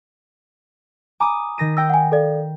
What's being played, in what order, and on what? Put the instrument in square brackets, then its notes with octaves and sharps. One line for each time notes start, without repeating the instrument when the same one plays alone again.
[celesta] G#5 A#5 B5 [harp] D6 D#6
[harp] D#3 A#6 D#7
[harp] G5 A#6 [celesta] E6
[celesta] F#5 G#5
A4 D5 F5